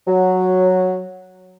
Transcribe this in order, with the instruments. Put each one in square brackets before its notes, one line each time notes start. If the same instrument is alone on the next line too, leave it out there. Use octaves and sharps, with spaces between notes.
[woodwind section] F#3